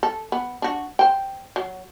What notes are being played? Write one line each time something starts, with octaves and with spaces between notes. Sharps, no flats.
A4
B3
D4 F#4
C5 G5
F#3